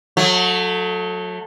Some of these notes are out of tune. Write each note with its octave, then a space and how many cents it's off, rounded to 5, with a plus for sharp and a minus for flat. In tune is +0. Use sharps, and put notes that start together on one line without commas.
F#3 -30 A3 +0